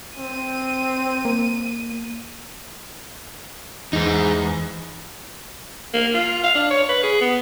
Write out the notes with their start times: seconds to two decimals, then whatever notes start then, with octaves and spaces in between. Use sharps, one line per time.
0.17 C4 D#7
1.25 A#3
3.93 E2 G#3 D#4
5.94 A#3
6.14 F4
6.44 F5
6.55 D4
6.70 C#5
6.89 B4
7.03 G#4
7.21 B3